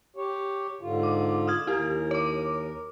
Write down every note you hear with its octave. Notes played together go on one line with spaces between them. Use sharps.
G4 C#5
G#2 D3 F4
D6
D#6 F6 G#6
D#2 E4 G4 A#4
C#5 D6